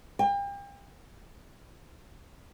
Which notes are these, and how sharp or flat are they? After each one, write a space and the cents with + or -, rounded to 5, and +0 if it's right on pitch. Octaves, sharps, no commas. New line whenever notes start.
G5 +35